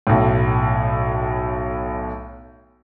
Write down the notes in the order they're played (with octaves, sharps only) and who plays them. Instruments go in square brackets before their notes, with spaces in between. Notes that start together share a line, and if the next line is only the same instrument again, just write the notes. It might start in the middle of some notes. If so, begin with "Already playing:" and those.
[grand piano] B1 A2